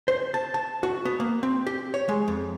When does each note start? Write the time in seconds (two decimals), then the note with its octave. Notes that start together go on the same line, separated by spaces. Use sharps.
0.08 C5
0.34 A5
0.54 A5
0.83 F#4
1.05 B3
1.20 A#3
1.43 C4
1.67 G4
1.94 C#5
2.09 G#3
2.28 F2